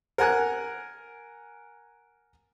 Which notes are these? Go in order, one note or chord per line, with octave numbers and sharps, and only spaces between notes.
A#4 F#5 G#5 F#6